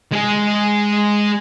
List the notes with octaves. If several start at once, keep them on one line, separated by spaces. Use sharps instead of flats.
G#3 G#4